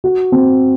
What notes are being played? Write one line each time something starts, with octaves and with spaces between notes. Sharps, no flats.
F#4
C4